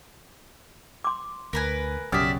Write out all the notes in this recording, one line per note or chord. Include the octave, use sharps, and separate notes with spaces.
C6 D6
D2 A#4 B4 G#5
B1 F#2 C#3 G4 D5 E5 D#6 F6